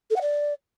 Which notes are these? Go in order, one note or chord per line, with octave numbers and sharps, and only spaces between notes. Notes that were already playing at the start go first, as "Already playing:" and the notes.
A4
F#5
D5